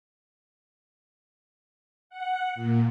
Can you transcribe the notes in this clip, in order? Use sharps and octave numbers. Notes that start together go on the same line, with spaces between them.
F#5
A#2